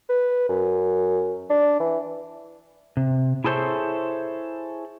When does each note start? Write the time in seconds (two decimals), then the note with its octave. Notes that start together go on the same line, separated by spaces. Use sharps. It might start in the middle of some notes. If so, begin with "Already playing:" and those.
0.09 B4
0.49 F#2
1.50 D4
1.80 E3
2.97 C3
3.44 E4 G#4 A4 C5 C#5 E5